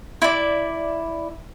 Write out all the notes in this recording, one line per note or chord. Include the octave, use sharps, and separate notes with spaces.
E4 D5